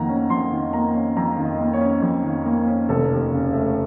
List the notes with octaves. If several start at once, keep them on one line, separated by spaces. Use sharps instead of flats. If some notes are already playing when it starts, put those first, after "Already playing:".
Already playing: F2 D#3 A#3 F#5 A#5
C#4
F2 C6
D#3
A#3 A#5
C#4
F2 A#5
D#3
D#5
A#3
C#5
C#4
F2
D#3
A#3
C#4
F1 A4
D#2
C#3
A3